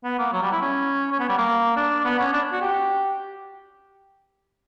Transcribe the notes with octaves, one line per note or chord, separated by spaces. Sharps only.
B3
A#3
F#3
G3
E4
C#4
C#4
B3
G3
A#3
D4
B3
C#4
D4
F#4
G4